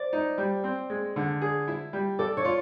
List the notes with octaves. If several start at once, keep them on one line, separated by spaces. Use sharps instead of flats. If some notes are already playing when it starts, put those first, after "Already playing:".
Already playing: C5 D5
D#4
G3
C4
G#3
D3
G#4
E4
G3
A4 D5
C#5
F4 D5